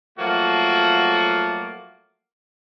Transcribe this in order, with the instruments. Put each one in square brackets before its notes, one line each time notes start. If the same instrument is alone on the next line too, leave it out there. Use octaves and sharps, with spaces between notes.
[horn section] F3 F#3 A3 A#3 F4 F#4